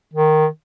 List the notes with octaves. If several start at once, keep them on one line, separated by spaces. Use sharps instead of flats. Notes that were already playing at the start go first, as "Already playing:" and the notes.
D#3